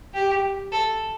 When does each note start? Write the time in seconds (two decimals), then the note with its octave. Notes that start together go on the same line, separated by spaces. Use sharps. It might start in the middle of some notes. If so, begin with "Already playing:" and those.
0.14 G4
0.72 A4